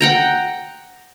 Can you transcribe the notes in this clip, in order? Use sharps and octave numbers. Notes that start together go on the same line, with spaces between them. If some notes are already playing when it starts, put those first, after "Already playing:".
F#5 G5 A#5